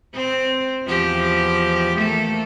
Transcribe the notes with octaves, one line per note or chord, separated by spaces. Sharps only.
C4
E2 F3 G4
A3 A#3 A4